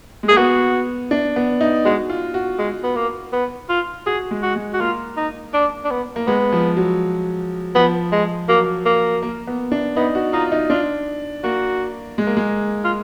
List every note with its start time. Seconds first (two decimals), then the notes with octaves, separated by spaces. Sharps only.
0.23 G#3
0.29 A#3 G#4
0.37 B3 F#4
1.11 D4
1.36 B3
1.61 D#4
1.85 G#3 F#4
2.10 F4
2.34 F#4
2.59 G#3
2.84 B3
2.96 A#3
3.33 B3
3.69 F4
4.06 F#4 G#4
4.31 G#3
4.43 F#4
4.56 G#3
4.73 F#4
4.80 A#3 F4
5.17 D#4
5.54 D4
5.85 D4
5.91 B3
6.16 A#3
6.27 G#3 B3
6.53 F3
6.77 F#3
7.75 F3 B3
8.12 G#3
8.49 F#3 A#3
8.86 A#3
9.23 A#3
9.47 B3
9.72 D4
9.96 B3 D#4
10.15 F#4
10.33 D#4 F4
10.52 D#4
10.70 D4 F4
11.44 A#3 F#4
12.18 G#3
12.27 A#3
12.37 G#3
12.84 F4